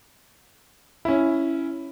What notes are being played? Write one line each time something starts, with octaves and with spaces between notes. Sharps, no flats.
C#4 E4